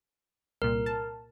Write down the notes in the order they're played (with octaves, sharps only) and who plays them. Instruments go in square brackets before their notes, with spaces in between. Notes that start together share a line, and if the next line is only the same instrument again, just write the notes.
[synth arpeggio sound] C2 A#2 [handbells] A#4
[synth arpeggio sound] A5